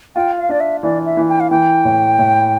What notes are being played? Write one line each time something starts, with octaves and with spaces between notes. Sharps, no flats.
F4 G5
F5
D4 D5
E5
E3 D5
E5
E3
G5
F5
E3 G5
A2
A2